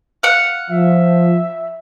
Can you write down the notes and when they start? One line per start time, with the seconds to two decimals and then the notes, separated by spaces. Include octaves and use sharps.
0.23 F5 F#5
0.70 F3 E5